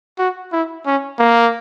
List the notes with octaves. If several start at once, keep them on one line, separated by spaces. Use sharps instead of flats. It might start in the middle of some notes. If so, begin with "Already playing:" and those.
F#4
E4
C#4
A#3